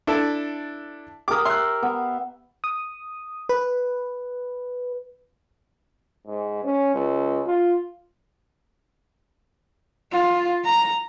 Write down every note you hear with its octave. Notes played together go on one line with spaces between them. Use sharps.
D4 E4 A4
G4 A#4 D6 D#6
E5 C6 F#6
B3
D#6
B4
G#2
C#4
C#2
F4
F4
A#5